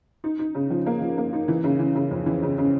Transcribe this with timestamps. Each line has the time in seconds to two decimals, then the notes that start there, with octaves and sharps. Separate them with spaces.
0.24 D#4
0.39 D#4
0.55 C#3
0.70 F3
0.86 A#3
1.02 F3
1.18 A#3
1.33 D#4
1.48 E3
1.64 C#3
1.79 E3
1.96 C#3
2.11 F2
2.26 E3
2.43 C#3
2.58 C#3